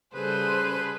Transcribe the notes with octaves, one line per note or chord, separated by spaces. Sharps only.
C#3 G3 G#4 A4 B4 C5